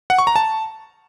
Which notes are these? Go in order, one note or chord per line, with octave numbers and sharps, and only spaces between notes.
F#5
C#6
A#5
A5